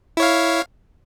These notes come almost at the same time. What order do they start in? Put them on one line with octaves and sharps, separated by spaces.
E4 C#5 F5